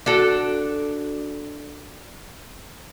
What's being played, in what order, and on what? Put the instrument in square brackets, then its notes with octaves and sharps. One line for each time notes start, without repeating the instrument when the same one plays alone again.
[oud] D4 F#4 A4